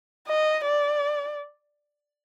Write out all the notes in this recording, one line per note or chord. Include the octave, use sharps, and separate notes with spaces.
D#5
D5